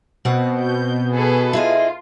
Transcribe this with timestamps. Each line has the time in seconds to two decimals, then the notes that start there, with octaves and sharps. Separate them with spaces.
0.25 B2 C4 F#5
0.60 G6
1.12 G#4 A4 B4
1.53 E4 F4 G#4 D#5